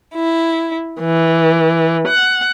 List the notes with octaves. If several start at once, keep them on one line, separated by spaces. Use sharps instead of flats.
E4
E3
F#5